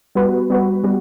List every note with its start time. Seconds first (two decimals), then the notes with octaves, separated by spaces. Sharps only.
0.15 G3 B3 F#4 B4
0.50 G3 B3 F#4 B4
0.84 G3 B3 F#4